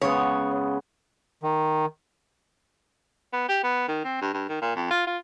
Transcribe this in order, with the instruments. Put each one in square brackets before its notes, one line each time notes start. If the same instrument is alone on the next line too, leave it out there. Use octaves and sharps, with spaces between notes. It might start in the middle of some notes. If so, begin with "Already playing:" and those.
[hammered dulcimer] C#3 G#3 B3 [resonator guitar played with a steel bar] C#5
[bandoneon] D#3
[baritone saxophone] B3
G4
B3
D#3
C4
G2
G2
D#3
A#2
F2
F4
F4